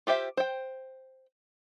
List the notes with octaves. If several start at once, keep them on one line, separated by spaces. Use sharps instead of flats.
F4 G4 C5 E5
C5 G5